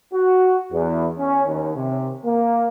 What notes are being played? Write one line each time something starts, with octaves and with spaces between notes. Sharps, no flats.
F#4
E2
C#4
D#2
C3
A#3